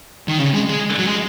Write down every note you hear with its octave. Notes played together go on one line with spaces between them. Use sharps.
D#3
C#3
G#3
G#3
F#3
G#3